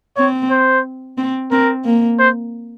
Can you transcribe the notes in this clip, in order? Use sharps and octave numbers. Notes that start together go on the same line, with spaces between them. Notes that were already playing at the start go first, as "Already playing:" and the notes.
C4 C#5
C5
C4
C4 A#4
A#3
C5